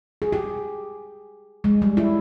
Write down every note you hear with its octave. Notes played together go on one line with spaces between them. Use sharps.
G#4
G4
G#3
G3
E4